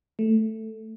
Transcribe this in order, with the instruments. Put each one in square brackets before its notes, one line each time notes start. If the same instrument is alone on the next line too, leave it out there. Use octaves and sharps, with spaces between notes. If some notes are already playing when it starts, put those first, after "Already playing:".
[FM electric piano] A3